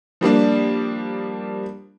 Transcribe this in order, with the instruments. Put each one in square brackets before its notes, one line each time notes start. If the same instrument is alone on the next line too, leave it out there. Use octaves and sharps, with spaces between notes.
[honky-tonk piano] F3 G3 A#3 D4